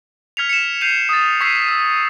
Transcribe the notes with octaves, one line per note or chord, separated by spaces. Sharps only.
F6 G#6 B6 C#7 F7
C#7 E7
G6 C7 D#7 F7
D#6 A6
C#6 E6 G#6 B6 C7 F7
E6